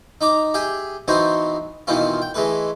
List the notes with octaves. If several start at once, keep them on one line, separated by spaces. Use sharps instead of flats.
D#4 A#5 D6
G4 G#4 E5 G5
E3 B3 C4 D#4 F#4 C5
B2 D#3 E3 C4 E4 F4
G5
E3 G#3 A3 B4